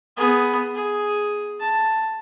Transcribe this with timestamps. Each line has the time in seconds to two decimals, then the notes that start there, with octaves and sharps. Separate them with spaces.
0.17 B3 G#4
0.75 G#4
1.60 A5